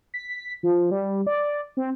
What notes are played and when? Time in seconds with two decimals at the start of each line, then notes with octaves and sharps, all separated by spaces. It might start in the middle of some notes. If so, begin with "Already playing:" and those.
0.14 B6
0.63 F3
0.91 G3
1.27 D5
1.77 C4